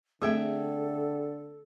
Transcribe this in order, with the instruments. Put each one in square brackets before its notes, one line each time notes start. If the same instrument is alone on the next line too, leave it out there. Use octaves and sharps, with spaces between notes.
[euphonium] D3 [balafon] A3 A#3 C4 [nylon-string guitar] G#4 E5 G5 [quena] A4